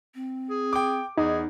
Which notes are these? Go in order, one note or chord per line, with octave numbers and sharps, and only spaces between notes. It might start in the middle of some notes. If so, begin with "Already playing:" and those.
C4
G#4
G5 D6
E2 D#4 G#4